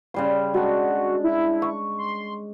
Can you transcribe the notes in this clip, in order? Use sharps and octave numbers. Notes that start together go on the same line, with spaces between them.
C#3 G3 C6
G#3 D4 F#4
E4
C#6
C6